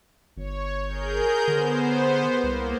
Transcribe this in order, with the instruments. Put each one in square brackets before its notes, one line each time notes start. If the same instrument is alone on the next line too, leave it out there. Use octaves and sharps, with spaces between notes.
[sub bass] G1 [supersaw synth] C#5
[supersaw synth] G#4 A#4 G6
[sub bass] D3 [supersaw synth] B3 C5
[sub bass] C2 [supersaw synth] A#3